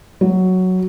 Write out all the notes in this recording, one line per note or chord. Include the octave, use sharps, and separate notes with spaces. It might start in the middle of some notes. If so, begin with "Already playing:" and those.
F#3